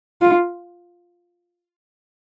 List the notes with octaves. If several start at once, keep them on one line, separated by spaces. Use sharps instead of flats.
F4